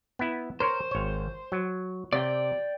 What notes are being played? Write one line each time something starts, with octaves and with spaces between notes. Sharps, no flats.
B3 E4
A#4 C5 C#5
G#1 C#5
F#3
C3 D5 G5